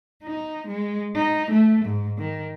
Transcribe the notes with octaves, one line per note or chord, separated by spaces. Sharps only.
D#4
G#3
D#4
A3
G#2
D#3